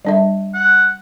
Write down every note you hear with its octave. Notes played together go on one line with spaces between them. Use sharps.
G3 D4 E5
F#5